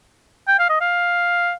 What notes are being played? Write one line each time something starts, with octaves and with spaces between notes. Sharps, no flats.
G5
F5
D#5
F5